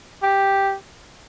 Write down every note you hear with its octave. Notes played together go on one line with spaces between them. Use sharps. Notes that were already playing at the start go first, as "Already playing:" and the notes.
G4